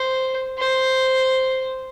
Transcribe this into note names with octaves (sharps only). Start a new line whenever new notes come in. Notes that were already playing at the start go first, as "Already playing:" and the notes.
Already playing: C5
C5